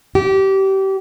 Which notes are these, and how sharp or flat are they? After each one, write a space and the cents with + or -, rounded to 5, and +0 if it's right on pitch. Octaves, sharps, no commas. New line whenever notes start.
G4 -25